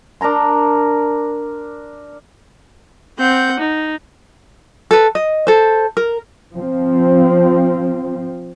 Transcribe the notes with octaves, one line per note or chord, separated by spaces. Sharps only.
D4 A#4 A#5 C6
C4 F#5 G6
D#4
A4 B4
D#5
A4 C5
A#4
F3 C4